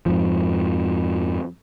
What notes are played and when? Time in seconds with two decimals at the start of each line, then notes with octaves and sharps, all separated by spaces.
0.06 F2 G#2 F3